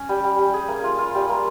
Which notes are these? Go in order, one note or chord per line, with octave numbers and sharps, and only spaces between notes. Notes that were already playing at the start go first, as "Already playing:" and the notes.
Already playing: C#4
G3
G3
G3
G#4
A#3
F4
F4
G3
A#3